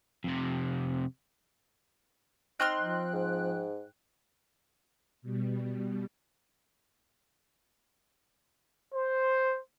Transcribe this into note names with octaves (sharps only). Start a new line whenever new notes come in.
F2 C3
C4 D#4 G5 C6 F6 F#6
F3
G#2
B2 G3
C5